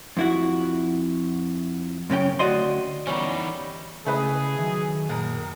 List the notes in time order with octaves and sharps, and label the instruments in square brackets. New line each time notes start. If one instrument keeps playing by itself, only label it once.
[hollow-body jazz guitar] F2 E4 F#4
F#2 C#3 C#4 G5
D2 F#4 D5 D#5 C6
[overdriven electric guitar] E3 D#4 [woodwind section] G3 [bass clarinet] B3 [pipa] C#4 G4
[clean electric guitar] C#3 E4 [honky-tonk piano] A3 B4 D#5 [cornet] G#4
[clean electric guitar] D#3 F#3
[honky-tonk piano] F#1 A#4 [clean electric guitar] A#2